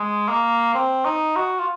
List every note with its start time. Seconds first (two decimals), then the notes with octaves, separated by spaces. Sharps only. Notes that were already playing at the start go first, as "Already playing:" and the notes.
Already playing: G#3
0.29 A#3
0.75 C4
1.05 D#4
1.36 F#4
1.59 F4